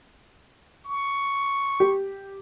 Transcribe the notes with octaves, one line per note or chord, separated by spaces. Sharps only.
C#6
G4